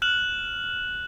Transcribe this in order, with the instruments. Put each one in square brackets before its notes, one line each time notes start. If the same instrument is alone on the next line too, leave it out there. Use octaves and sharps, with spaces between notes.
[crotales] F6 F#6 E7 F#7